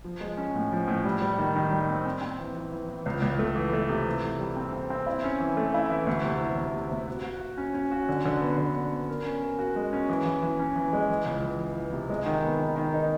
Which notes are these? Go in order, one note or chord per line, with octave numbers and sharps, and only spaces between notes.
F3
G#3
C#4
A2
F3
A2
G3
G3
D#3
D#3
G3
C4
C4
C4
E3
E3
E3
E3
C#2
C#2
A3
E3
A3
C3
E3
E3
G3
C4
C4
C4
E4
C#4
E3
A3
E4
E3
D2
C3
E3
D2
C3
D2
F#4
F#4
F#4
C#4
C#4
F#4
D3
D3
B3
D3
D3
B3
A#4
C#4
A#4
F#4
G#3
C#4
E3
E3
E3
C#4
E3
G#3
E3
C#2
E3
E3
E3
C3
G#3
D#3
B3
D#3
D#3
D#4